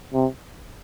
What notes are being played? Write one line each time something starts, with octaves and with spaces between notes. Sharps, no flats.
C3